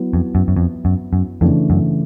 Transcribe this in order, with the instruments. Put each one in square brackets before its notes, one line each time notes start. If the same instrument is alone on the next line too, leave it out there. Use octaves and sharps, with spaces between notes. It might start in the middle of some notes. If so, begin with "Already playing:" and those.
Already playing: [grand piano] F#3 B3 E4
[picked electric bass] F2
F#2
F#2
F2
F#2
F#2
[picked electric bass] F2 [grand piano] C#3 E3 A3 D4
[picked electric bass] F#2